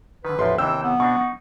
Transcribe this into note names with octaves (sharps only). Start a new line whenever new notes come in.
D3 D#3 B4
A1 E2 F3 C6
D#2 C3 E3 G5 E6
B3
B2 C4 D4 C#6
D#4